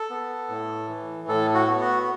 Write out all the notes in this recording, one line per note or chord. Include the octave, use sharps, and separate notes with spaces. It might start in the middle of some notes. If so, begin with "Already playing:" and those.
Already playing: A4
B3
A2
E3
A2 A4
F#4
B3
F#4